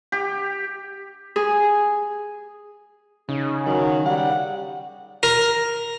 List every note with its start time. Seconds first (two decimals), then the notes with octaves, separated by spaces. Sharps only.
0.12 G4
1.36 G#4
3.29 C#3 D#4
3.66 D#3 F#3
4.06 G3 F#5
5.23 A#4